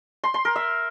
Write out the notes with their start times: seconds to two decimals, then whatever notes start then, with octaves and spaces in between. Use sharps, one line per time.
0.24 C6
0.34 C6
0.45 A#4
0.56 E5